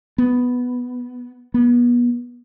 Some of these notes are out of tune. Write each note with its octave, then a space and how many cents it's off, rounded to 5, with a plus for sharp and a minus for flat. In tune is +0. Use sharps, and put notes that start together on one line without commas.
B3 +0
B3 -35